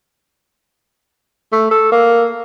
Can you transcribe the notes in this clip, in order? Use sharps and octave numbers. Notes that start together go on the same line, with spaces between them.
A3
A4
A#3